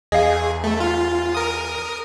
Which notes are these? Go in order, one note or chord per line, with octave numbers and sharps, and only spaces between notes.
E2 G#4 D#5 F5
A3
F4
A#4 D#6